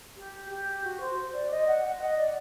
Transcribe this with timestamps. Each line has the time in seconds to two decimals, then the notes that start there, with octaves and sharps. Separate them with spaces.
0.17 G4
0.50 G4
0.84 F#4
1.00 C5
1.33 D5
1.51 D#5
1.67 F#5
1.84 F#5
2.01 D#5
2.17 D5